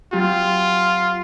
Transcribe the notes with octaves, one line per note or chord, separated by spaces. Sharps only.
F#3 C4 F4 G4